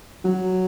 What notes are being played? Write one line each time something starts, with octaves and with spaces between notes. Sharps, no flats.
F#3